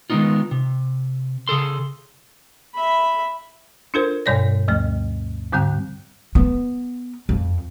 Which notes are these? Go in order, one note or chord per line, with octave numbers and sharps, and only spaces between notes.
D#3 G#3 A#3 B3 D#4 F4
C3
C#3 G#4 A4 C6
E5 B5
D4 F4 A4 A#4 C5
G2 B2 G3 C#5 D5 A#6
D2 F3 A3
G#2 D3 G3 C4 G5 F#6
B3
F2